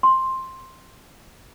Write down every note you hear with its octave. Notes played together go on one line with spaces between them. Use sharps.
C6